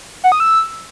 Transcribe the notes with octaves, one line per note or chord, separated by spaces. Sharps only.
F#5
D#6
E6